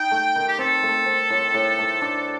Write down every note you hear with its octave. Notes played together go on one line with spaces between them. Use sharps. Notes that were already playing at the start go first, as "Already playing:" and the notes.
Already playing: D#4 G5
A3
D#3
G4
C4 A4
A3
C4
A2
A2
A3
D4